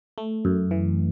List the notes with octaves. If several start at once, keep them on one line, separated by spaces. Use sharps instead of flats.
A3
F#2
E3